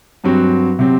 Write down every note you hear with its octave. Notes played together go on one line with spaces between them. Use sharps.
G2 F#3 C4 F#4
C3 F#3 C4